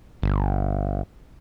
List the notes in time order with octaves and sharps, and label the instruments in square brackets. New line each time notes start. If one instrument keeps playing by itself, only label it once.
[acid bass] G1